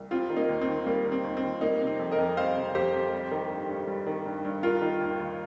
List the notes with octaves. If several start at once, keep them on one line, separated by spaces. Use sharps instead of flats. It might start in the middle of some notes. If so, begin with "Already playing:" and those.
Already playing: C2
G3 C4 F4
D#3
A#3 D#4
D#2
C4
D#2
G3 A#3
D#3
C4
D#2
C4
D#2
G3 A#3 D#4
C3
C4
F2
A#4 D#5
F2
G3 C5 F5
C3
F2 G4 C5
F2
G3
D#3
G2
G2
G3
D#3
G2
G2
G3 F4 A#4
D#3
D#2
D#2